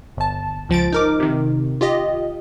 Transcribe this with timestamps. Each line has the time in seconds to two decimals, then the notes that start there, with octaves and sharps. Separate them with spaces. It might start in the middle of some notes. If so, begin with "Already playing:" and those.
0.17 G1 A5
0.69 C#2 F3 A6 D7
0.93 D#4 A#4 D6
1.20 C3 D#3
1.81 F4 G4 D#5